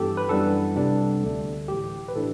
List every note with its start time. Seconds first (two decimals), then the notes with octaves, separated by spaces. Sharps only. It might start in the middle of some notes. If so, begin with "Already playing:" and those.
Already playing: G2 E3 B3 G4 A4
0.17 B4
0.29 F#2 E3 G3 B3 D4 A4
0.75 C2 C3 G3 B3 D4
1.22 D2 D3 A3
1.68 B1 A2 E3 G4
2.08 B4
2.15 A2 E3 A3 D4 A4